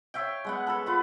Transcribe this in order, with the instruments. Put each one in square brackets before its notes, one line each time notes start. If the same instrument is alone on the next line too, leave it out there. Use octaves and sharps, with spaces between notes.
[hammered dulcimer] C#5 E5 F5 G5
G#3 B3 F#5
A4 B4 B5
F4 B4